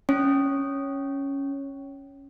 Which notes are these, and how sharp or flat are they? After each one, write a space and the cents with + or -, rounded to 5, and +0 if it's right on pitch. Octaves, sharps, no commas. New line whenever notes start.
C#4 +0 C#5 +0